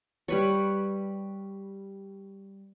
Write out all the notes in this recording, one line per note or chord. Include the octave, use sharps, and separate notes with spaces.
G3 B4 C#5